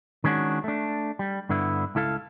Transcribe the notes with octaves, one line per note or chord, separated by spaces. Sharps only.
D#3 G#3 C#4 D4 F#4
A3 D4
G3
G2 D3 B3 E4
C#2 E4 A4 F5